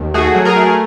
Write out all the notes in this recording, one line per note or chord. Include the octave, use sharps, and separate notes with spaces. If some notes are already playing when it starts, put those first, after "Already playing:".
Already playing: D#2
A3 F#4 G#4
F#3
G#4 A#4
A3